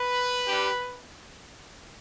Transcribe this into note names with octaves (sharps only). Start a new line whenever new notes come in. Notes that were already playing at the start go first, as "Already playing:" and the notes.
Already playing: B4
G3 D4 G4